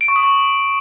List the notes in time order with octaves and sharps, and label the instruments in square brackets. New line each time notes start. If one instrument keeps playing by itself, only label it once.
[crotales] D7
C#6
D#6
C#6